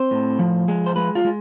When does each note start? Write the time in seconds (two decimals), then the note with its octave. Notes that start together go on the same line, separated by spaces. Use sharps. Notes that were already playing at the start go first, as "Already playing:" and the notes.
Already playing: C4 C5
0.11 A2
0.39 F3
0.68 G#3
0.86 C5
0.96 G#3 B4
1.15 F4
1.24 G#3